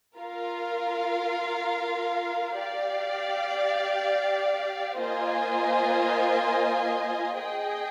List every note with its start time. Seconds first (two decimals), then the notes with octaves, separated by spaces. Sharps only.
0.17 F4 A#4 F5
2.58 G4 D5 F5
4.97 A#3 F4 C5 D#5 G#5
7.38 G#4 D#5 G5